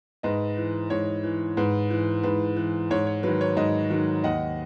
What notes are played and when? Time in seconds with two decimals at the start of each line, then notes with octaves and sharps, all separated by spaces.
0.23 G#2 B4 D#5
0.57 E3
0.90 G#2 C#5
1.24 E3
1.57 G#2 B4
1.91 E3
2.23 G#2 B4
2.56 E3
2.91 G#2 C#5
3.07 C#5
3.23 D#3 F#3 B4
3.41 C#5
3.56 G#2 B4 D#5
3.90 D#3 F#3
4.24 D#2 D#5 F#5